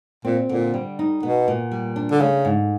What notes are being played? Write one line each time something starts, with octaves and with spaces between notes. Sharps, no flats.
A#2 C4
A#2 D3
G3
D#4
B2 B3
A#2
G3
D4
D3
C#3 A3
G#2